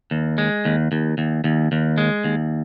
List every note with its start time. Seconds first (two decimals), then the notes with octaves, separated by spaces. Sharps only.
0.11 D#2
0.38 G#3
0.65 D#2
0.92 D#2
1.18 D#2
1.44 D#2
1.72 D#2
1.98 G#3
2.24 D#2